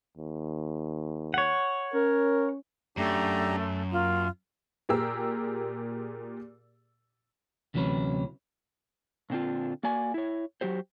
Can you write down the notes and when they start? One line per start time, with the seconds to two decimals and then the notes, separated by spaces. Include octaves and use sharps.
0.17 D#2
1.34 C#5 F#5
1.94 C#4 A#4
2.97 F#2 A3 D4 G4 A#5
3.92 A#3 F4
4.89 A#2 G4 G#4 A#4 E6
7.74 D2 C3 E3 F#3 C#4 B4
9.30 A#2 D3 C4 D4 F4
9.83 A#3 F#4 D5 G#5
10.14 E4 C#5
10.61 F#3 F#4 G4 C5